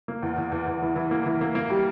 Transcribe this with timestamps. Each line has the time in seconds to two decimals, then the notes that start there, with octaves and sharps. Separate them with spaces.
0.08 A#3
0.23 E2
0.38 E2
0.52 E2
0.67 E2
0.82 E3
0.96 E3
1.11 A#3
1.26 E3
1.41 A#3
1.55 A#3
1.70 G3